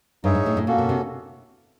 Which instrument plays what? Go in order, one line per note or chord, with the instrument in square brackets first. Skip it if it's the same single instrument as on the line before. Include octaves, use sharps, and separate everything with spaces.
[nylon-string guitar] G2 [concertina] D#4 G#4 C#5 E5
[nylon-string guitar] G#2
A2
A2
[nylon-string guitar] A#2 [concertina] A#3 C#4 F#4 A4
[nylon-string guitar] B2
C3